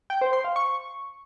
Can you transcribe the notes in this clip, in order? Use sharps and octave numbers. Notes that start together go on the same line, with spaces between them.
G5
C5
C6
F5
C#6